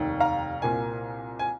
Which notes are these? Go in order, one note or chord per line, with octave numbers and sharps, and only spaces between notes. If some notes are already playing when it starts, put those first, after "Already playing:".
Already playing: F1 D#2 D#3
F5 A#5
C2 A#2 A#3 G#5
G#5